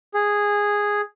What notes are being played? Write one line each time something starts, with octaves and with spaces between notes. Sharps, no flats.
G#4